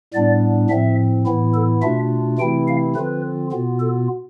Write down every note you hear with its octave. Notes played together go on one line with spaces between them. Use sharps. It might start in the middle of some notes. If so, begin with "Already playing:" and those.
A2 G3 B3 D4 D5
A2 F3 C4 E5
A2 E3 B3 E4
A4
B2 A3 D4 F4 E5
C3 E3 A3 C4 E4 G5
F5
D3 F3 C4 F4 B4
B2 B3 F4
A4